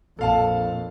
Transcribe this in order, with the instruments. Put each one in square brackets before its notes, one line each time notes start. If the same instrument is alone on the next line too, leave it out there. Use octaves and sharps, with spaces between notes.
[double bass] A#1 [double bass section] F2 [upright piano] A4 F5 A5